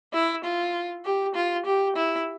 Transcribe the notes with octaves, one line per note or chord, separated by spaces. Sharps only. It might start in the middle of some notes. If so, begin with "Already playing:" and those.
E4
F4
G4
F4
G4
E4